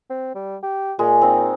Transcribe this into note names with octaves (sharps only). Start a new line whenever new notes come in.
C4
G3
G4
A#2 G#3
C4 D#4